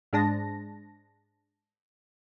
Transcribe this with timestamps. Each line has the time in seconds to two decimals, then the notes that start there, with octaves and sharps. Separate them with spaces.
0.13 G#2 G#3 D4 A5 A#6